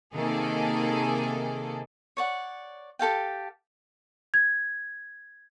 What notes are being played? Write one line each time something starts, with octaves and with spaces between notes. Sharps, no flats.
C3 D#3 A#3 G#4 A4
C#5 D5 F#5
G4 A4 F5 G5
G#6